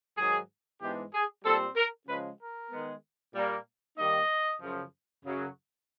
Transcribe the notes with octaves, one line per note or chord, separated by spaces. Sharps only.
G#2 D#3 F#3 G#4
G#2 E3 G#3 B3 D4 G4
G#4
A#2 G3 C4 A4
A#4
C#3 F3 G#3 C#4 B4
A#4
D#3 G#3 B3
A#2 G3 A#3
D#3 G3 A#3 D#4 D#5
F#2 C#3 F3
F#2 C#3 F#3